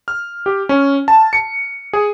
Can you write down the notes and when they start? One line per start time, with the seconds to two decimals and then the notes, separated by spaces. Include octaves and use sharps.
0.08 F6
0.46 G4
0.69 C#4
1.08 A5
1.33 C#7
1.93 G#4